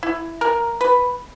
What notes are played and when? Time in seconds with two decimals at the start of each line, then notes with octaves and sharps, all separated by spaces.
0.03 E4
0.41 A#4
0.81 B4